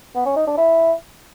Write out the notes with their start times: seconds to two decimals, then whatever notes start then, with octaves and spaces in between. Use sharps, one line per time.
0.15 B3
0.26 C#4
0.36 D#4
0.47 D4
0.57 E4